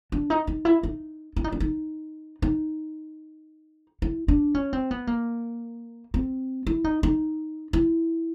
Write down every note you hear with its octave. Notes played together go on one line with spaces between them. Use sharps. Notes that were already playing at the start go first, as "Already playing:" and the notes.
D4
D#4
D#4
E4
D#4
E4
D#4
D4
D#4
D#4
E4
D4
C#4
C4
B3
A#3
C4
E4
D#4
D#4
E4